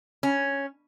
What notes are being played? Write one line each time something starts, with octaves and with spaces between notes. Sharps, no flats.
C#4